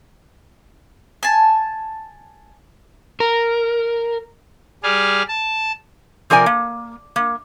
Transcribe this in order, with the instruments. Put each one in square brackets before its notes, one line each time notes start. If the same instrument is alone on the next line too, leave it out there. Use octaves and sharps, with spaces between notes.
[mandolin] G#5 A5
[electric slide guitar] A#4
[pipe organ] G3 G#4 D5 F6
A5
[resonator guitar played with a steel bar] C3 F3 A#4 D5 G#5
A#3
A#3